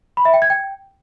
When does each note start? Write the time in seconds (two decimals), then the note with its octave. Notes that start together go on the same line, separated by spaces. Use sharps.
0.17 B5
0.25 E5
0.34 G5
0.42 G#6
0.50 G5